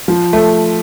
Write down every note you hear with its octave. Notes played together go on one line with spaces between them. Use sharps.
F3
A3